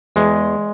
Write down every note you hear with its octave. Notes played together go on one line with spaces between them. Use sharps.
E2 G#3